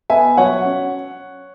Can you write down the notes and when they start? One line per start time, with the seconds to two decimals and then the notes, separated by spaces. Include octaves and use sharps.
0.10 B3 E5 G#5
0.37 F#3 C#5 F#5
0.65 C#4